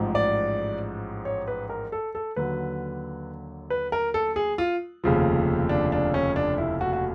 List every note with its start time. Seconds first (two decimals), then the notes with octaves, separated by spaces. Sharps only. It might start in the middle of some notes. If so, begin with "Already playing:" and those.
Already playing: A1 G#2 F3
0.15 D5
1.25 C#5
1.48 B4
1.70 A#4
1.92 A4
2.15 A4
2.36 D#2 D3 F#3 B4
3.70 B4
3.92 A#4
4.14 A4
4.36 G#4
4.58 F4
5.04 F1 D#2 C#3 F3
5.69 D4
5.92 D4
6.14 C#4
6.36 D4
6.58 E4
6.81 F#4
6.93 F#4